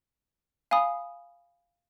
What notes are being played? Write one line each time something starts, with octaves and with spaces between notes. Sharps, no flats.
F5 G#5 B5 D#6